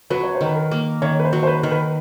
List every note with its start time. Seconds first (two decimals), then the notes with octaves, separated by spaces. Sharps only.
0.10 F#3 B4
0.24 C#5
0.35 C5
0.41 D#3 B4
0.56 A#4
0.71 A#3
1.02 D#3 C#5
1.20 B4
1.25 C5
1.33 F#3
1.43 C5
1.47 B4
1.63 D#3
1.71 B4